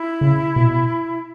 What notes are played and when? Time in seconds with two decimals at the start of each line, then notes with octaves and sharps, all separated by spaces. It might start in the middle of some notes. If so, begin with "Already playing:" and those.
Already playing: E4
0.21 C#3
0.56 B2